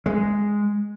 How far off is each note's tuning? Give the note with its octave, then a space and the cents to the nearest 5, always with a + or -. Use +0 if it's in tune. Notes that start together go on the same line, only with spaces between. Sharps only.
G#3 -5